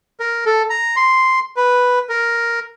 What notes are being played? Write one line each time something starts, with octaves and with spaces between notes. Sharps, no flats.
A#4
A4
A#5
C6
B4
A#4